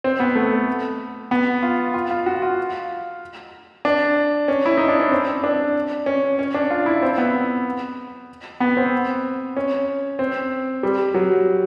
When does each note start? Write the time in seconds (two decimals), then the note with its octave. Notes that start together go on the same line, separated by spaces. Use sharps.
0.04 C4
0.20 B3
0.35 A3
1.31 B3
1.63 F4
1.94 F4
2.11 F4
2.26 F#4
2.42 F4
3.85 D4
4.48 C#4
4.66 E4
4.77 D#4
4.88 D4
5.00 C#4
5.11 C4
5.44 D4
6.06 C#4
6.39 C#4
6.54 D4
6.70 F4
6.86 E4
7.03 C4
7.18 B3
8.60 B3
8.77 C4
9.57 C#4
10.19 C4
10.83 G3
11.14 F#3